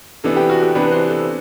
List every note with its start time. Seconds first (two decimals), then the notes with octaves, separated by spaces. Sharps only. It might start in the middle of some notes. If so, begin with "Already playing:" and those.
0.24 C3 E3 B3 D4 A4
0.36 G4
0.50 F#4
0.63 G4
0.75 C3 E3 B3 D4 B4
0.92 C5
1.10 A4